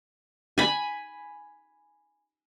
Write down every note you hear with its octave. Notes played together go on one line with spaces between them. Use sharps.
G#5 B5